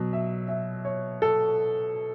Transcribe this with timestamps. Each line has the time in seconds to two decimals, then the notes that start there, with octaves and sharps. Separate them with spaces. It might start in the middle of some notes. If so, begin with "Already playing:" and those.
Already playing: B2 F#3
0.13 E5
0.48 E5
0.85 C#5
1.22 A4